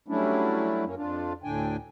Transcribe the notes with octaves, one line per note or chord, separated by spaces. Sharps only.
F#3 G3 A3 C#4 D4 E4
F#2 A#3 C#4
F2 D4 F4
D2 A2 D3 D4 G5 G#5